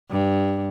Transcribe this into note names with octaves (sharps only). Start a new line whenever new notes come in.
G2